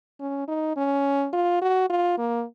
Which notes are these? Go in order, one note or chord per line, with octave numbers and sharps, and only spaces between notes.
C#4
D#4
C#4
F4
F#4
F4
A#3